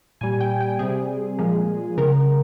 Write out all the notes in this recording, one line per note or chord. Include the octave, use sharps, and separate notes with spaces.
A#2 G3 G#5
G5
G5
C3 G3 G#4
A#2 F3 G#3
C#3 G#3 A#4